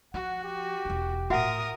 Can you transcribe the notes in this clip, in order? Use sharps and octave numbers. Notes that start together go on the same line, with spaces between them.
F3 F#4 F#5
G4
E1 D#4
A2 F4 F#4 A#4 E5 F#5 D#6